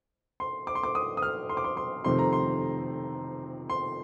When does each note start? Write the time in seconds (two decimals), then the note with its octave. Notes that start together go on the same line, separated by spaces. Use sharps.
0.40 C6
0.67 D6
0.75 C6
0.83 D6
0.95 D#6
1.17 D#6
1.22 F6
1.49 C6
1.57 D6
1.64 C6
1.77 C6
2.04 F2 C3 D#3 A3 C4 C6
2.19 A#5
2.33 C6
3.70 C6